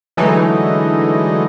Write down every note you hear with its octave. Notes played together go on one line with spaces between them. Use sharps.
D3 E3 F#3 G#3 A3 D#4